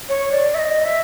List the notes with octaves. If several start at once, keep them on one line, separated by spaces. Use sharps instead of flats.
C#5
D5
E5
D#5
E5